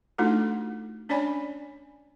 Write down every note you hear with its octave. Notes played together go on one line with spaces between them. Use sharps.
A3 D4 D#4 F4 F#4 A4
C#4 D4 C#5 D5 G#5 B5